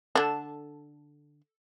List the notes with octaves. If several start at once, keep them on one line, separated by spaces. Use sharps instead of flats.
D3 D4 A4 A5